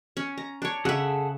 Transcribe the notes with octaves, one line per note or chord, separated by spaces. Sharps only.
C#4
A#5
D4 C#5
C#3 G#4 A4 E5 F#5